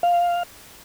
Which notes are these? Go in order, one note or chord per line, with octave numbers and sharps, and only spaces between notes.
F5